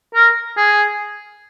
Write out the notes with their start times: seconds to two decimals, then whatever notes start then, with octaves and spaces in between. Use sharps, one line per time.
0.14 A#4
0.57 G#4